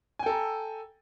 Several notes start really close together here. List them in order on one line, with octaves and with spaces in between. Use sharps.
G#5 G5 A4 A#5